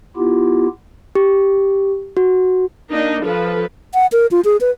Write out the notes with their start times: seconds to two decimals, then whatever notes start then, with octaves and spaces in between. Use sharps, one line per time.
0.17 B3 E4 F4 G4
1.15 G4
2.17 F#4
2.90 A#3 D4 D#4
3.23 F3 A4 B4
3.94 F#5
4.12 A#4
4.31 F4
4.45 G#4
4.61 B4